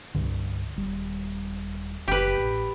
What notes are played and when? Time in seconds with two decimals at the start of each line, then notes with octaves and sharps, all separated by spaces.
0.14 C2 G2 D3
0.76 D#1 G3
2.08 F#1 G4 B4
2.37 A1